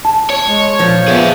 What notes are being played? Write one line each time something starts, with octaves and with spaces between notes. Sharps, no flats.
A5
C#5
G#3
A#2 F3
B3 G#4 E5